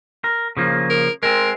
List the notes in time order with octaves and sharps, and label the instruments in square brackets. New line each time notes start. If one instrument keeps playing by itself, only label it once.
[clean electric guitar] A#4
C#3 F3 A#3
[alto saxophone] A#4
[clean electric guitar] G#3 C4 [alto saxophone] A#4